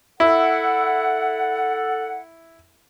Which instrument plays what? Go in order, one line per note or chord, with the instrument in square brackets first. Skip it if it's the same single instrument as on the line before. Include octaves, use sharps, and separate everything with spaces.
[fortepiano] E4 [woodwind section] A4 F#5